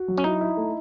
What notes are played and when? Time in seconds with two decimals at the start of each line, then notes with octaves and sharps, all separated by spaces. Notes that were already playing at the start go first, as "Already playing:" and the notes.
Already playing: F#4
0.08 F#3
0.18 C#4
0.24 D#4 E4
0.41 E4
0.57 A3